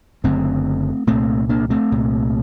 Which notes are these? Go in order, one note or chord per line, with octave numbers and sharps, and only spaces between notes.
F#1 F#2 D3 A3 C4
C2 A#2 A3 C4
A#3 D4
A3 C4
C2 A#2